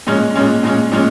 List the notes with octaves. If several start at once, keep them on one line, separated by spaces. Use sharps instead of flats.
A#2 G#3 C#4
A#2 G#3 C#4
A#2 G#3 C#4
A#2 G#3 C#4